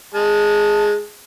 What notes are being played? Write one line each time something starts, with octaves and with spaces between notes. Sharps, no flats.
G#3 A5